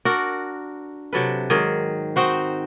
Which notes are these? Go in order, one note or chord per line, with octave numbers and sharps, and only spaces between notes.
D4 F#4 A#4
C3 F#3 A4 B4
G#2 D#3 F#3 G#4
C4 D#4 F#4 C5